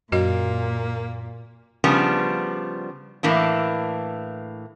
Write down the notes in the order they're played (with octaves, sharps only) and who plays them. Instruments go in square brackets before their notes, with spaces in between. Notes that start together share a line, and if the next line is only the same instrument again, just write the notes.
[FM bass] F#2 [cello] A#2 [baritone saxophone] A#3 [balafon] F#4 D#5
[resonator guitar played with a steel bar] C#3 F3 G3 B3 D4
A2 E3 A#3 D4